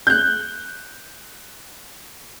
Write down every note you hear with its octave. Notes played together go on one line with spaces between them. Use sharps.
F#6 G6